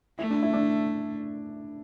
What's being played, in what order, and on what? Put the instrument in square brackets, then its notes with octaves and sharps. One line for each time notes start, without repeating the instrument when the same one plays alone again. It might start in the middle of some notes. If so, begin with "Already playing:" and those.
[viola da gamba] A3 [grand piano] E4
[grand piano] D4
E4
D4